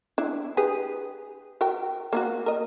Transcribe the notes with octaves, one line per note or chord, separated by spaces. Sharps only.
D4 E4
G4 G#4 B4
F#4 A#4 G5
A#3 F4 F#4
A#4 D#5